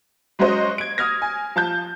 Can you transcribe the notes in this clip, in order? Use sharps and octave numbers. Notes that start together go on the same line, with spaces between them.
F#3 G#3 C#4 F#4 C5 D#5
G#6 D7
D#6 F6 G#6 A#6
G#5
F3 A5 G6